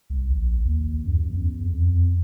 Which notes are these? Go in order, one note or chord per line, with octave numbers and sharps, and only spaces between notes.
C2
A#1
D#2
F#2
E2
F2